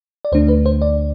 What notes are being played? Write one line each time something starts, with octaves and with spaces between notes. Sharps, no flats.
D5
D2 D3 A3 D4 C5
B4
C5
D5